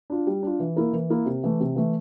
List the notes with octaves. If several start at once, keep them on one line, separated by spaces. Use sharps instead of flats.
D4 F4
G3
D4 F4
E3
A#3 E4 A#4
E3
A#3 E4 A#4
C3
E3 A3
C3
E3 A3